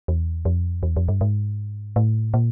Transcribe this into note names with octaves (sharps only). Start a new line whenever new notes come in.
E2
F2
E2
F2
G2
G#2
A2
A#2